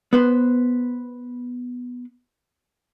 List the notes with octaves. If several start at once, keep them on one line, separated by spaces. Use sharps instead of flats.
B3 B4 C5